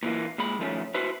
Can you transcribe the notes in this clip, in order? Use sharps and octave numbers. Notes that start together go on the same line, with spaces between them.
A#2 E3 A#3
A#2 G#3 B5
D#3 F3 A3 C#4
E4 F#4 B4 C5